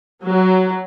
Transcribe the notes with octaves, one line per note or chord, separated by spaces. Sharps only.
F#3